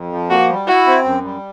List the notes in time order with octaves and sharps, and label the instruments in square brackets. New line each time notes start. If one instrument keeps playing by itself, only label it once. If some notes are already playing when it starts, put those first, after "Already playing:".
Already playing: [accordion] F2
F3
[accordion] A#3 [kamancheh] F#4
[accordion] G3
[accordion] E4 [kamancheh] F#4
[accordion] C4
F#2
G3